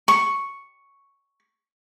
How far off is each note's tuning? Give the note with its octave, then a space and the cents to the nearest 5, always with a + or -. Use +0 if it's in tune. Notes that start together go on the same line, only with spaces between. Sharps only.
C#6 +0